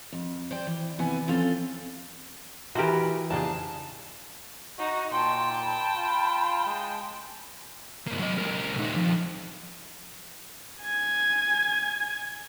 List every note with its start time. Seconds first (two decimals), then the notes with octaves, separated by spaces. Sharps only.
0.13 F2
0.51 C5 D5 G5
0.67 E3
0.99 C3 E3 B3 G#5
1.28 F3 C4 C#4 F4 A4 F5
2.75 E3 B3 E4 F#4 G4 A#4 C5
3.31 F2 C#3 A#3 D4 G#4 A5
4.79 D#4 F#4 D#5
5.11 A#2 G5 A5 C6
5.64 B5
5.95 F4
6.67 G#3
8.07 G2 A#3
8.19 F#3 D#5
8.38 C#2 A#4
8.77 A#2 D#4
8.96 F2
10.84 G#5 G#6